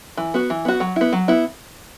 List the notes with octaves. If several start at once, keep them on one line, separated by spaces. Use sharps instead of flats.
E3
B3 F#4
E3
B3 F#4
F#3
B3 E4
F#3
B3 E4